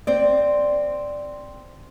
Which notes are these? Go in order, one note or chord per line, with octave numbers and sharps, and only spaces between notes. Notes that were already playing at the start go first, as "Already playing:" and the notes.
C4 C5 D5